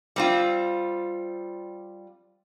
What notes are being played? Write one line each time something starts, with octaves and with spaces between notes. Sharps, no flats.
G3 C4 F4